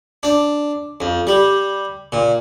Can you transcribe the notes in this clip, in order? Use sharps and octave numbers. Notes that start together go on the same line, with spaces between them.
D4
F2
G3
A#2